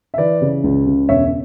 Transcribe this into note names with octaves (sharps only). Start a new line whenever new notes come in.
E5
E3 B4 D5
C#3
C#2
C#3
E1 C#5 E5